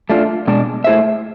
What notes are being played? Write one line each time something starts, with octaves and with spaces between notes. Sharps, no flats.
A3 D4 F4
B2 G#3 D4
A3 E4 G#4 C5 E5